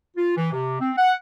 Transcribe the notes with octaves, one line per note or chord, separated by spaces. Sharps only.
F4
E3
C3
C4
F#5